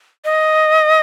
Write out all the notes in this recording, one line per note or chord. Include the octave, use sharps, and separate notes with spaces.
D#5